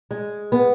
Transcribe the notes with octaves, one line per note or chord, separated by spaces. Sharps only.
G#3
B3